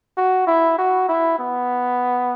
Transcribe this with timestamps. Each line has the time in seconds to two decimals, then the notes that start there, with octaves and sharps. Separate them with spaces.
0.17 F#4
0.47 E4
0.78 F#4
1.08 E4
1.39 B3